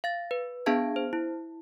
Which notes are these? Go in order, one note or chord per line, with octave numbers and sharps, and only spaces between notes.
F5 A6
B4
B3 D4 G#4 F5 A5 G#6
C5
E4